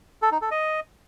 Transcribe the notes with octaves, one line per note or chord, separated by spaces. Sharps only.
A4
D#4
A4
D#5